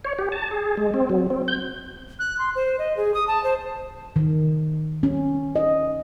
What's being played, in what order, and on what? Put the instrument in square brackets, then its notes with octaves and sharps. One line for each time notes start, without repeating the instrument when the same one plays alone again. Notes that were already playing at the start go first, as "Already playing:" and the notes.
[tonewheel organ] C#5
G4
A5
G#4
G#3
C4
F#3
C4
G6
[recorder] F#6
C6
C5
D#5
G#4
D#6
A5
C5
[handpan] D#3
C#4
D#5